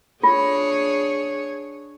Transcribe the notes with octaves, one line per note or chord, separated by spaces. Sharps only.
D4 F4 G#4 C#5